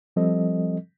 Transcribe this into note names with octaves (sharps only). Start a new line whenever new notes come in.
F3 G3 C4 A4 D#5